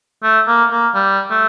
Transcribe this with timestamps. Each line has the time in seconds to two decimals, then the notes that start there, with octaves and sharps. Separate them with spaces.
0.23 A3
0.47 A#3
0.71 A#3
0.95 G3
1.30 A3